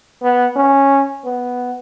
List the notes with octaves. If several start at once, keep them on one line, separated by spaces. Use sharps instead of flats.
B3
C#4
B3